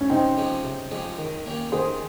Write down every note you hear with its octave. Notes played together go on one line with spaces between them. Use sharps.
C#4
C3 C4 D#4
F3 G#3 C#4 G4
C3
F3 G#3 C#4 G4
D#3
A#3 C#4 G4
D#3 G#4 C5